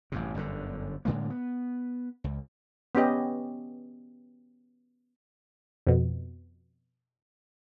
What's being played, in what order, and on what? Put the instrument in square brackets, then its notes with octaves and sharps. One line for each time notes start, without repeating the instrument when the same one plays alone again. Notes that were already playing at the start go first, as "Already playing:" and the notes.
[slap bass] A1 G2 C3
G1 F#2 A2 D3
A2 D3 G#3 A#3
B3
C#2
[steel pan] B3 C#4 G4 D#5
[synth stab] F2 B2